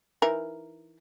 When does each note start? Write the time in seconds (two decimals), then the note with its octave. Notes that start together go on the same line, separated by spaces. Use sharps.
0.22 E3 D#4 A#4